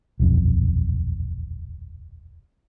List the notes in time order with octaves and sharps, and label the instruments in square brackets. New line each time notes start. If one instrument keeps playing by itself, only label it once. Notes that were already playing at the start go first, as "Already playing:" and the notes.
[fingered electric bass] D#1 B1 F2